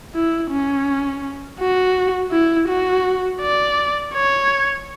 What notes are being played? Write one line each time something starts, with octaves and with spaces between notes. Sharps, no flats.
E4
C#4
F#4
E4
F#4
D5
C#5